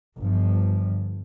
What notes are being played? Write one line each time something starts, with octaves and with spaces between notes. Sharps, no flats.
G1 F3